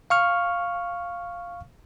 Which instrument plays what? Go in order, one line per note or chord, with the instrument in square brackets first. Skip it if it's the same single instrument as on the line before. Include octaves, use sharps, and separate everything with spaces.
[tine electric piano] F5 C#6 F6